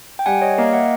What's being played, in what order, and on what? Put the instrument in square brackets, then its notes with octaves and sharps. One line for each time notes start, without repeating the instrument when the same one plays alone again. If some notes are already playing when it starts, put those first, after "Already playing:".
[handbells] G5
[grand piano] G3 [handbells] F#5 G#5
[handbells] C#5 D#5
[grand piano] A#3 [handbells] D#5 F5
[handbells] E5 F#5